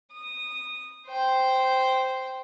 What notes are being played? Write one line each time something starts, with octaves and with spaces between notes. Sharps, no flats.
D#6
C5 G5